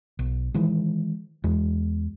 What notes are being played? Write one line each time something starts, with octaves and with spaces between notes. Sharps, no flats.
B1
D#3 E3 G#3
E2 G#3